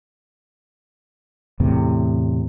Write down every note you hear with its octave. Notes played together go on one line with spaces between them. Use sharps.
E2 A2 C3